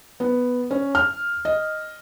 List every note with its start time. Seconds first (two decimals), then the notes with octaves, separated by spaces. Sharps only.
0.20 B3
0.71 C#4
0.95 F6
1.45 D#5